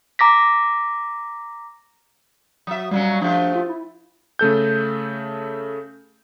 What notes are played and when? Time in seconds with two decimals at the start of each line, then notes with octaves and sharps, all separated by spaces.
0.19 A#5 D6 A#6 B6
2.67 F#3 E5 D#6
2.91 A#2 F#3 G3 C#4
3.21 F3 A3 D4 G4
3.55 F4
3.69 E4
4.39 C#3 A3 A4 G6